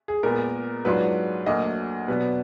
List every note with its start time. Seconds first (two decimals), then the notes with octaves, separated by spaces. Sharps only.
0.08 G#4
0.23 A#2 G#3 B3 A#4
0.85 G#2 F#3 D4 F4 B4
1.46 D2 D3 F#3 A#3 D#5
2.08 B2 F#3 B3 D4 B4